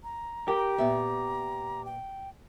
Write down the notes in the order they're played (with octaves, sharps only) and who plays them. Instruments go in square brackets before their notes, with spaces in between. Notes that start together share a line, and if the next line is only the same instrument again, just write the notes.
[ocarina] A#5
[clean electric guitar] G4 [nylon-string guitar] A#4
[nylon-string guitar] A#2 B3 E5
[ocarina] G5